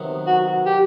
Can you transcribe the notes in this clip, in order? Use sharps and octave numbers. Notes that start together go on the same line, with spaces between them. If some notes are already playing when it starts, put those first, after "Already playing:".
Already playing: C3 D#3 F#3 B3
F#4
G4